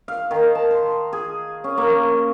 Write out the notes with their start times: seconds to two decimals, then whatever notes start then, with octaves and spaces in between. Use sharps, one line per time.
0.08 F5
0.31 D#3
0.55 A5
0.71 C6
1.13 G#4
1.64 C#4
1.78 A#3